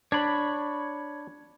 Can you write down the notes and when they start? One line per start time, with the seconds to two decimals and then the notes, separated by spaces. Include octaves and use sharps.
0.12 D4 C#5 B5